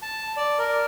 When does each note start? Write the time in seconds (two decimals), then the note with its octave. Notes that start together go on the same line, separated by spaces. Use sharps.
0.02 A5
0.37 D5
0.59 A#4